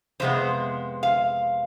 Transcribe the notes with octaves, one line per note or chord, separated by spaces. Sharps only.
F2 C3 G#3 B3 C5
F5